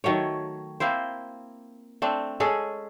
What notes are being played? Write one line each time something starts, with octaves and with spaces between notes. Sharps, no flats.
D#3 F#3 A3 C#5
A#3 C4 E4 C5
A3 C4 D4
G#3 C#4 G#4 A4